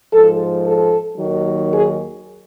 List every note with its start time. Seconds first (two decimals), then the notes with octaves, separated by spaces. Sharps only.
0.12 G#2 F3 A4
0.65 A4
1.17 D#2 D#3 F#3
1.71 G#4